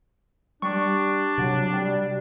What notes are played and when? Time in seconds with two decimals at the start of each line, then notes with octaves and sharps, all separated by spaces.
0.62 G3 D4 C#6
1.38 C3 F#3
1.73 G3